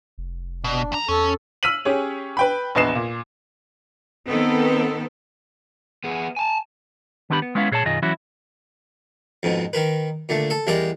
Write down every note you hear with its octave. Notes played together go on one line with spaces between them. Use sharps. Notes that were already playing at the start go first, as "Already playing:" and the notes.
F1
B2 D4
E2 A#5
E2 C#4 A4
E6 F6 B6 D#7 F#7
C#4 G4 G#4 C#5
B4 G5 B5
A#1 E2 B4 D#5 C7 E7
A#2
D#3 B3 C4 A4
B3 G#4
G#5 A5
D#3 B3 D4 E4 G4 B5
B3
G#3 B3 C#4 E4 F5
A#2 G#4 C#5 D5 A5
B1 F#2 D#3 F4 G#4 D#5
E3 F#3 C#4 E4 F#4
F2 G#2 B2
D#3 A#4 B4
A#2 D3 A3
A4
E2 G3 G#3 A#4 D5 D#5